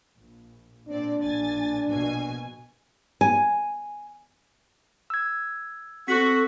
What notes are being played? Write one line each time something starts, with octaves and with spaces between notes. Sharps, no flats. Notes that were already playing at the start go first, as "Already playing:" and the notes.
A#1
A#2 C4 D4 D5
A#1 G#5 A6
A#1 B2 G#5
G#5
E6 G#6
C4 F#4 A4 B6